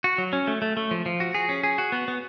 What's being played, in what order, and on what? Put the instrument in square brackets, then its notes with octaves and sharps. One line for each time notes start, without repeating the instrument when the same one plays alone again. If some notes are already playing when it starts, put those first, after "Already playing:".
[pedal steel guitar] F#4
F#3
C#4
A3
A3
A3
F3
F3
F#4
G#4
C#4
G#4
F#4
B3
B3